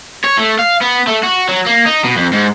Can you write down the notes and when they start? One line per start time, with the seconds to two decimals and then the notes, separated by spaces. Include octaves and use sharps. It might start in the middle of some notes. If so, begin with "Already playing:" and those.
0.24 C#5
0.38 A3
0.59 F5
0.82 B3
1.08 A3
1.23 F#4
1.49 F#3
1.66 A#3
1.86 D#4
2.04 B2
2.16 F2
2.33 G#2